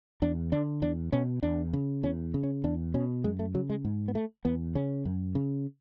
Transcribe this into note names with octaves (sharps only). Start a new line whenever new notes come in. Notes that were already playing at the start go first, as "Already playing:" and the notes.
E2 D4
D3 D4
E2 D4
B2 C#4
E2 D4
C#3
E2 C#4
C#3
C#4
E2 D4
B2 C#4
F#2 G#3
A3
C#3 F#3
G#3
G#2
B3
A3
E2 B3
C#3 C#4
F#2
C#3